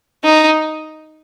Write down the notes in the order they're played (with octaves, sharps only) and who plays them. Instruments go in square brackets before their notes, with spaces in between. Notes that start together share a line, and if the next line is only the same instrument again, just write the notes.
[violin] D#4